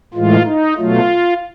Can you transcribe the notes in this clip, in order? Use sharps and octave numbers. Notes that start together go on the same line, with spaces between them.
A2 E3 G#3 F4
D#4
B2 F#3 A3 F4